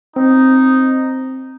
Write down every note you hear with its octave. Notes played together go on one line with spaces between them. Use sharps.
C4 D#4